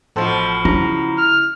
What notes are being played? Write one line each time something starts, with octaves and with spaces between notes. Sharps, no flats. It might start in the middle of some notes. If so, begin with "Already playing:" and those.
A1 B2 F3 A4 C5
C#3 E4 A#5
F6